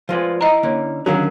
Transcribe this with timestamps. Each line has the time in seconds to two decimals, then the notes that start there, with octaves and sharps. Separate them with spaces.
0.09 F3 G#3 A3 F4 B4 D5
0.41 E4 D#5 A#5
0.63 D3 A#3 C#4
1.06 D3 D#3 F#3 C#4 G#4 A#4 F5